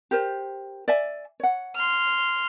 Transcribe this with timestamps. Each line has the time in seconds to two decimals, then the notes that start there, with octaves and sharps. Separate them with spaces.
0.11 G4 A#4 C5
0.88 D5 E5 G#5
1.40 C#5 F#5
1.76 C6 F6